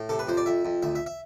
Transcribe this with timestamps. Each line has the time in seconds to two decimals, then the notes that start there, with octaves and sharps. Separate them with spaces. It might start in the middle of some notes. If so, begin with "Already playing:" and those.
Already playing: A2
0.09 C3 A4
0.19 B4
0.28 F2 C5
0.37 D5
0.46 F2 E5
0.65 F2
0.83 D2 E5
0.95 E5
1.06 E5